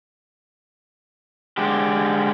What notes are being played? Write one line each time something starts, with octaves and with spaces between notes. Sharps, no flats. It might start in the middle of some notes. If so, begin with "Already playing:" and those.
D3 G#3 G4